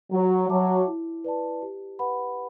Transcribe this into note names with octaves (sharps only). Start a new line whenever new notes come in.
F#3 F#4
F#3 C#5 E5 A5 D6
E4
B4 D5 A5
G4
B4 F#5 B5